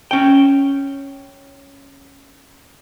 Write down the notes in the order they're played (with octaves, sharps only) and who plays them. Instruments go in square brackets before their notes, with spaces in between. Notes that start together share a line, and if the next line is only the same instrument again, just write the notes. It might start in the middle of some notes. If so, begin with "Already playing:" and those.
[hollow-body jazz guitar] C#4 G5